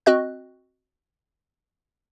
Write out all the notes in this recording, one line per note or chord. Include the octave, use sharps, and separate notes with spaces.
C4 F#4 D#5 F#6